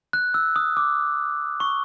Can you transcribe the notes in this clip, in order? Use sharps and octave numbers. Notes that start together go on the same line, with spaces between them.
F#6
E6
D#6
D6
C#6